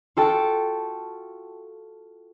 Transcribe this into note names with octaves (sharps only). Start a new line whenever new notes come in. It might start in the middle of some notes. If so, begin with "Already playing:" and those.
F4 F#4 A4 G5 A5